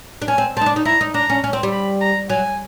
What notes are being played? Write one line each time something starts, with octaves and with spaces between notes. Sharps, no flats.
D4
C#4 G#5
C4
C4 A5
D#4
D4
D#4
E4 A#5
D#4
D4 A#5
C#4
C#4
C4
G3
B5
A#5
F#3 G#5